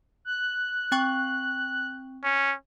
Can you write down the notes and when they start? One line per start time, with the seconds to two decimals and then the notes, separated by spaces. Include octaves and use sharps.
0.25 F#6
0.92 C4 G5 C#6
2.24 C#4